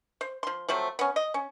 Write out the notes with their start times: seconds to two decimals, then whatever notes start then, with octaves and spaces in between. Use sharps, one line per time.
0.21 C5
0.43 F3 C6
0.68 F3 F#3 A3 C4
0.99 B3 C#4
1.16 D#5
1.34 C#4